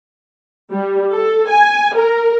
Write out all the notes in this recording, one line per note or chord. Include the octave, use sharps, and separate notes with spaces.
G3
A4
G#5
A#4